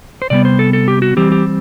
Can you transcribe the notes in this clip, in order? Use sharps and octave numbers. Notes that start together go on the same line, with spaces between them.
C5
C3 G3 B3 D5
C5
A4
A4
G4
F#4
E3 G3 C4 G4
G4